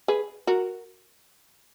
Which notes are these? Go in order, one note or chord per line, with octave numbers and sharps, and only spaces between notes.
G#4 B4
F#4 A#4